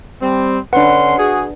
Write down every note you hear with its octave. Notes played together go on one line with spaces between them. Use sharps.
G3 C4
D3 C#4 D4 B4 F#5 C6
F#4 G#4